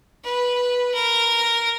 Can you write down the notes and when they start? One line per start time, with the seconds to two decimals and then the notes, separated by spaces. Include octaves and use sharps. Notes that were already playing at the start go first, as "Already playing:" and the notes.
0.24 B4
0.94 A#4